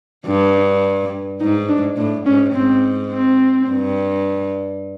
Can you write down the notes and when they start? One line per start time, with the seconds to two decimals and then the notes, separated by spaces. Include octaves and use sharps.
0.26 G2 D4
1.41 G#2 D#4
1.69 D4
1.97 A2 D4
2.26 G#2 C#4
2.55 G#2 C4
3.12 C4
3.69 G2